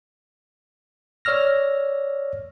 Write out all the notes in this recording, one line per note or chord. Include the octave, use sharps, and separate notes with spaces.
C#5 D5 E6 F6 A#6